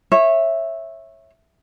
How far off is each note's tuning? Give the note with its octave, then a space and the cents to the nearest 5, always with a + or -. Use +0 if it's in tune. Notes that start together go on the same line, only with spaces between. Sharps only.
C#5 -20 E5 +0